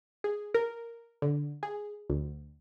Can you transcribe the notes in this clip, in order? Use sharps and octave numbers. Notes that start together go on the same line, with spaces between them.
G#4
A#4
D3
G#4
D2